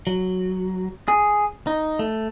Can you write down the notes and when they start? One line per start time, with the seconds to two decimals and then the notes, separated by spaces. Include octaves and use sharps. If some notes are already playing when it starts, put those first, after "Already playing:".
0.07 F#3
1.08 G#4
1.67 D#4
1.99 A3